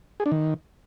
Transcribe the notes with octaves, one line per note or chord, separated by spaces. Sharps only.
G#4
D4
D#3